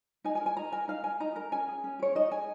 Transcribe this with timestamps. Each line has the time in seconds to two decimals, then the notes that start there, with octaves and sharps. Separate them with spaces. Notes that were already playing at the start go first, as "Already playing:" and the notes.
0.24 D#4 G#5
0.35 G#5
0.41 A#4
0.46 G#5
0.56 D#4 A#5
0.72 A#4 G#5
0.88 D#4 F5
1.04 A#4 G#5
1.20 D#4 A#5
1.36 A#4 A#5
1.52 C#4 G#5
1.68 G#4
1.84 C#4
1.99 G#4 C#5
2.15 D#4 D#5
2.31 G#4 G#5